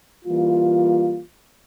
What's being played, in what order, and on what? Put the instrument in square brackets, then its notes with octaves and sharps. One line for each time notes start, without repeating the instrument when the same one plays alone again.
[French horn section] E3 G3 A#3 F4